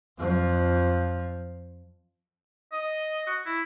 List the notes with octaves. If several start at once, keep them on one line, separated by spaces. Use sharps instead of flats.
F2 F3
D#5
F#4
E4